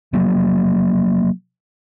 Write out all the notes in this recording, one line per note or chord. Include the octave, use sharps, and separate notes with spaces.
C3 F3 F#3 A#3